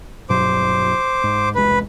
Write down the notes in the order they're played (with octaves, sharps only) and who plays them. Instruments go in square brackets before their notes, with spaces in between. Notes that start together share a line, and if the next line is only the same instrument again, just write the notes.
[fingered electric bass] G2 B2 F#3 [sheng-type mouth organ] C5 D6
[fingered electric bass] G#2
[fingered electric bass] E1 C2 G#3 [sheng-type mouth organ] B4